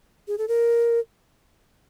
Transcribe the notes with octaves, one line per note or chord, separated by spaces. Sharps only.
G#4
A4
A#4